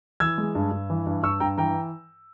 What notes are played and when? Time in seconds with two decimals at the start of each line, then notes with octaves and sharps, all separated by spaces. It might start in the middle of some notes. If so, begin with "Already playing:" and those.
0.20 E3 E6 G#6
0.38 G#3
0.55 G2
0.72 G2
0.90 E3
1.07 G2
1.23 G2 C#6 E6
1.40 G2 G5 A#5
1.58 E3 G5 A#5